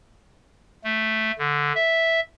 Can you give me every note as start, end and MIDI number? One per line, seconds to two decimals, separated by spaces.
0.84 1.31 57
1.39 1.72 50
1.75 2.20 76